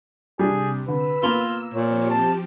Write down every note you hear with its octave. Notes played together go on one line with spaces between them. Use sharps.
C3 G3 D4 G#4
D3 B4 E6
A#3 B3 F4
A#2 F3 C4 G4 C#5
A5